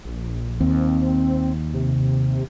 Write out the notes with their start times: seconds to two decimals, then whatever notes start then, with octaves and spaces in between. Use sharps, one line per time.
0.05 A#1
0.61 D#2 C4
1.74 C3